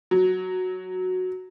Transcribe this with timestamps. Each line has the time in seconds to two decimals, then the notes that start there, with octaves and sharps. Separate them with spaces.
0.11 F#3